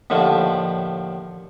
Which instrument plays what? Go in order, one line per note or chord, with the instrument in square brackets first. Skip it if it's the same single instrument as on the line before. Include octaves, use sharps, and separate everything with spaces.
[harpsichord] D#2 A2 D3 F3